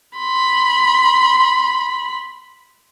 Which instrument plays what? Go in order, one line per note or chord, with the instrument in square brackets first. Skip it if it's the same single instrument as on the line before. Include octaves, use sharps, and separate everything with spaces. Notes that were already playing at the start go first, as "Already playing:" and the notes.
[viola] B5 C6